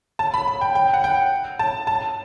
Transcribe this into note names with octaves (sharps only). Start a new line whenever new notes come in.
A5
B5
B5
G5
G5
F#5
G5
A5
A5